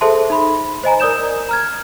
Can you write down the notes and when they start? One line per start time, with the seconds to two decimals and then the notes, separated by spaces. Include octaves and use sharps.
0.01 G#4 A4 C5 E5 A5 C6
0.30 D#4 B5
0.84 C5 D#5 G#5 A#5
1.00 A#4 D5 D#6 G6 E7
1.49 A#5 F6 G#6